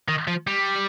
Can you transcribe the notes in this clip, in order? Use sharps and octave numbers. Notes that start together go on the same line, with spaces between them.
D#3
F3
G3